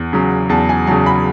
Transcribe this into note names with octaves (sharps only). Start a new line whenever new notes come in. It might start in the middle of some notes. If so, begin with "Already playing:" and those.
Already playing: E2
C#3 F#3
E2 A5
G#5
C#3 F#3 A5
B5